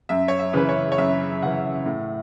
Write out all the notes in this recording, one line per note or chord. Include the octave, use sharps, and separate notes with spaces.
F#2 E5
C#5
E5
C#3 E3 B4
C#5
C#5
F#2 E5
C#3 E3 F#5
A2